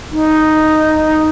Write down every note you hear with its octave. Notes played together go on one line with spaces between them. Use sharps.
D#4